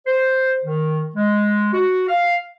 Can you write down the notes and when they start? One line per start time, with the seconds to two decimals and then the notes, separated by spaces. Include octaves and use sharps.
0.06 C5
0.64 D#3
1.15 G#3
1.73 F#4
2.08 F5